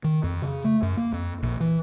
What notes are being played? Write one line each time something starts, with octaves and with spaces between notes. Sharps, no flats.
D#3
F2
C#3
A3
F#2
A#3
F2
A#1
E3